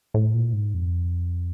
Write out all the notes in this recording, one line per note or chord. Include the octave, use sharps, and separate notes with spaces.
A2
A#2
G#2
F2